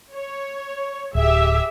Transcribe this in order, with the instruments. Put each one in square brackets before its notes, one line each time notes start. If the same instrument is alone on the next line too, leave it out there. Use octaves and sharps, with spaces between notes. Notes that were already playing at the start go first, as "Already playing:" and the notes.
[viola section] C#5
[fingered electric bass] D1 [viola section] G4 G#4 E5